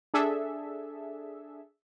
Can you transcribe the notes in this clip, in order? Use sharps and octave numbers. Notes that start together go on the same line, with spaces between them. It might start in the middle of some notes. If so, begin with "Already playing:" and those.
D4 G#4 A4 E5